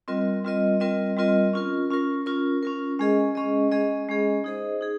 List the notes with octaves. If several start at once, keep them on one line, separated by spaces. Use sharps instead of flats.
G3 C4 F4 A#4 D#5
G3 C4 F4 A#4 D#5
G3 C4 F4 A#4 D#5
G3 C4 F4 A#4 D#5
C#4 F4 A#4
C#4 F4 A#4
C#4 F4 A#4
C#4 F4 A#4
G#3 C#4 G#4 D#5
G#3 C#4 G#4 D#5
G#3 C#4 G#4 D#5
G#3 C#4 G#4 D#5
D#4 G#4 C5 D#5
D#4 G#4